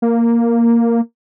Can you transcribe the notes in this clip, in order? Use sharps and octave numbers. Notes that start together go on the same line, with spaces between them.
A#3